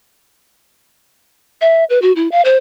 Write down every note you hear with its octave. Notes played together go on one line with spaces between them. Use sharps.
E5
B4
F#4
E4
F5
C5